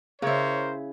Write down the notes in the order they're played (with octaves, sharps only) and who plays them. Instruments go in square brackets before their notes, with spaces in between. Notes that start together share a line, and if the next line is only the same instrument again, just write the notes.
[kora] C#3 E4 [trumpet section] A#4 C5 C#5